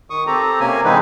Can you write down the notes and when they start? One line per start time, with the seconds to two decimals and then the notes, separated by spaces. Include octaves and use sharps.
0.10 D#3 C#6 D#6
0.27 C4 G4 A4 A#5
0.60 C3 A#3 C#4 G#5
0.84 D3 E3 G#3 C4 D#4 B4